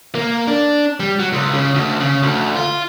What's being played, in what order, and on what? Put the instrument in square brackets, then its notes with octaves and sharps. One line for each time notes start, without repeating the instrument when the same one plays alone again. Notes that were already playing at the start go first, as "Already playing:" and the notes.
[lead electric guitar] A#3
D4
G3
F#3
C#2
C#3
D2
C#3
D2
F4